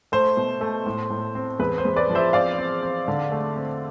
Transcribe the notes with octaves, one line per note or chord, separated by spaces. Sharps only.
A3 C5
B2
A3
A2
A2
C4
E2 B4
C5
E2
B4 D5
F3
C5 E5
C4 D5 F5
C4
C4
D3
A3
C4